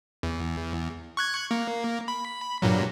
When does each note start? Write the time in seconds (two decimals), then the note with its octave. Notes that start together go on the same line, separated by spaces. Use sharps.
0.23 E2
1.17 C#6 F#6 G#6
1.51 A#3
2.08 B5
2.62 G2 A#2 F#3